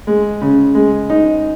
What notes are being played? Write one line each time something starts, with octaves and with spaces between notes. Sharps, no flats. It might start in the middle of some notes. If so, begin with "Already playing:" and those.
G#3
C#3
G#3
D#4